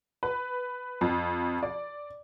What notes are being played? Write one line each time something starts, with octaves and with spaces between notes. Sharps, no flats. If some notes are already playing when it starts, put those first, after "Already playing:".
B4
F2
D5